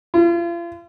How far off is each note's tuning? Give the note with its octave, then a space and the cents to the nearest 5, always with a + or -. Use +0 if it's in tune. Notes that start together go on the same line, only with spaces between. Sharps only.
F4 -40